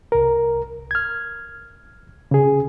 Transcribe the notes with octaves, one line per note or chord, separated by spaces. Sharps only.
C2 A#4
F6 G#6
C#3 G#4